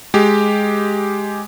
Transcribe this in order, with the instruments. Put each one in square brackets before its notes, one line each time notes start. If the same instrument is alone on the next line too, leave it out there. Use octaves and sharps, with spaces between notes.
[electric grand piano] G#3 G4